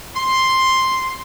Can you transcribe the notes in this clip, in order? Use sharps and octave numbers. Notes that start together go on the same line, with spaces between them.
C6